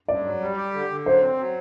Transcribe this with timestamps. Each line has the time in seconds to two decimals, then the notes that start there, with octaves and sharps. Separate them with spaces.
0.08 G2 D5
0.24 F#3
0.41 G3
0.57 G4
0.73 D3
0.90 D3
1.06 F#3 C5
1.22 C4
1.38 F#3